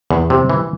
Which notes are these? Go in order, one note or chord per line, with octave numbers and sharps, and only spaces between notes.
E2
C3
E3